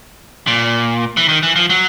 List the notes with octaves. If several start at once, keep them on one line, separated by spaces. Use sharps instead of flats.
A#2
E3
D#3
E3
F3
F#3